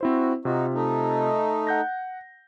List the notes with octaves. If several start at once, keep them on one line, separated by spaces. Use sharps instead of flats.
C4 E4 F#4 C5
C3 D#4 F4 F#4
A3 D#4
F#5 G6 A#6